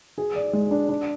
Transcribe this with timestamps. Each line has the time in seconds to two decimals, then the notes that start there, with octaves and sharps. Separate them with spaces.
0.18 G#4
0.35 D5
0.53 G#3
0.71 D4
0.89 D4